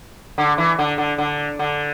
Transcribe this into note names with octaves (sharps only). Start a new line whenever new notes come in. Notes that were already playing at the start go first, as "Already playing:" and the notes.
D3
E3
D3
D3
D3
D3